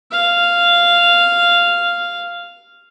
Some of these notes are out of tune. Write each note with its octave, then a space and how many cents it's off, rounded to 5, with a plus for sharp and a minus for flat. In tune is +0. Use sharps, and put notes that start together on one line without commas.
F5 -5